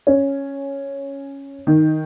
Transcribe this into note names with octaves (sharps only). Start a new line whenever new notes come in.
C#4
D#3